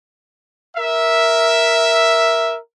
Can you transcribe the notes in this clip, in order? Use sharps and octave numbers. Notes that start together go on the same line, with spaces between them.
A#4 E5